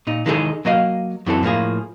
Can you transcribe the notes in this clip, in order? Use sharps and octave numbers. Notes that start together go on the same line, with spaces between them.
A#2 D#4
D#3 E3 G#3 D#4 G#4 A4
F#3 A#3 D#5 F5
F#2 E3 C4 A4
A2 F3 A#3 G#4